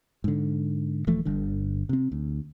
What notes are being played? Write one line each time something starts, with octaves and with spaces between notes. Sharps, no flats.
G#2 D3
D#1 E3 F3 A3
G1 G2 D3
C3 C4
D2